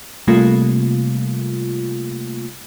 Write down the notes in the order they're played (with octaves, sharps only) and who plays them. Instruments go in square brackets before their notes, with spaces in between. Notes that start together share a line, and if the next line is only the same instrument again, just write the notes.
[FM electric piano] C3 G3 A3 A#3 F4